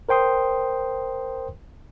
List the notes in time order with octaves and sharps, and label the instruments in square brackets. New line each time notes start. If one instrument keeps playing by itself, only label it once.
[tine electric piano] A#4 C5 G5 C6 D#6